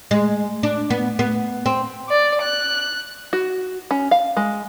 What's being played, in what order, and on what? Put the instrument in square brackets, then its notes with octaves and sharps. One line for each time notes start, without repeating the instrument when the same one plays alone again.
[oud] G#3
D4
B3
B3
C4
[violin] D5
F#6
[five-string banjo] F#4
C#4
F5
G#3